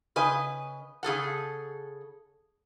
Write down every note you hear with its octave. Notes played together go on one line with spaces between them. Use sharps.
C#3 B4 D#5 G#5
C#3 G#4 A4 F#5